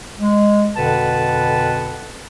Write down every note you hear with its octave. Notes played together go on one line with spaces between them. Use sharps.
G#3
F2 B2 D3 B4 F#5 A5